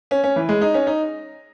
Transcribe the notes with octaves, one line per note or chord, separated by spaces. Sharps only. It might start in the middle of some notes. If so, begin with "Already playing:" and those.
C#4
C#4
E3
G#3
D#4
C#4
D#4